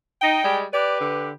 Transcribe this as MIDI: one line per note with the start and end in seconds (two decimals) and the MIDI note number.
0.21 0.39 63
0.21 0.57 79
0.43 0.63 55
0.43 0.63 56
0.73 1.29 67
0.73 1.29 71
0.73 1.00 74
1.01 1.32 50